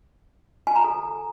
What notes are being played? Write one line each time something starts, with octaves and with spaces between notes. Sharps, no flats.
G#5
A#5
A4